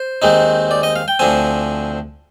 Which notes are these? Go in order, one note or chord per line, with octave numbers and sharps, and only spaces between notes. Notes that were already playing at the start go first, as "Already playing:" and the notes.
Already playing: C5
D#2 D#3 G#3 C4 D#4
D5
D#5
F5
G5
D2 D3 F3 C4 G#5